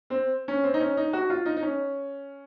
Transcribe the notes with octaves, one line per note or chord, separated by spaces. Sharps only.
C4
C#4
C4
D#4
C#4
D#4
F#4
F4
D#4
D#4
C#4